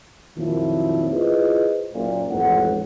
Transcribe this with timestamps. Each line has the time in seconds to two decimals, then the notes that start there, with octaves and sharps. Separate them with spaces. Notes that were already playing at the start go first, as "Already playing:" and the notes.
0.38 F2 A#2 D#3 F3 F#3 E4
1.13 E4 F4 G#4 B4 C5 D#5
1.93 F#1 A#2
2.31 A1 F2 G#2 F#5